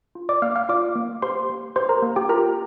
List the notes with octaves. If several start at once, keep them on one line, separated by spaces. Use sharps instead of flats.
F4
D5 D6
A#3 F5 F6
F5 F6
F4 D5 D6
A#3
G4 C5 C6
A#3
G4 C5 C6
A#4 A#5
A#3
G4 G5
F4 A#4 A#5